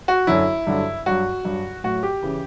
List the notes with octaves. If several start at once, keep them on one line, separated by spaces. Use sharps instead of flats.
F#4
F#2 D3 F#3 E4
G2 D3 F#3
G2 F#3 F#4
G2 F#3
A2 F#3 F#4
G4
C#3 E3